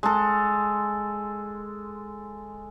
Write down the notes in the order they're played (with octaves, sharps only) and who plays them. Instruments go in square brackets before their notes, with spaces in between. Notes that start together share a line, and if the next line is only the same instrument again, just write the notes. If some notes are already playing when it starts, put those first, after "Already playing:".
[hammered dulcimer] G#3 A4